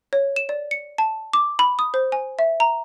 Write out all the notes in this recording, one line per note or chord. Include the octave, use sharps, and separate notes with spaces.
C#5
E7
D5
C#7
A5
D6
B5
D#6
C5
G#5
E5
A#5